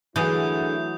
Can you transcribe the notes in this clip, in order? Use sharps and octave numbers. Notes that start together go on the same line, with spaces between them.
D3 E3 F#3 A3 E4 G#4 D#6 G6